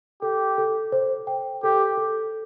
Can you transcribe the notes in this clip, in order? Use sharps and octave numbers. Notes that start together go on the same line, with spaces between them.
G4 A4
A4
C5
G5
G4 A4
A4